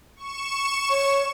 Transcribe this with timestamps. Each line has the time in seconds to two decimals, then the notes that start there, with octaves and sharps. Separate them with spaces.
0.16 C#6 E7
0.90 C#5